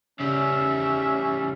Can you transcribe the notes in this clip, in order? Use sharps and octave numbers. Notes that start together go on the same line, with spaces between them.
C#3 G3 C#4 E5